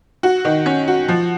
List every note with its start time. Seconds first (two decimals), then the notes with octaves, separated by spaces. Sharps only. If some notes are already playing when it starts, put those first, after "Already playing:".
0.23 F#4
0.45 D#3
0.66 C#4
0.88 F#4
1.08 F3